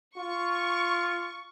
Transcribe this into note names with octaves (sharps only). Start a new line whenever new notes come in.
F4 C#6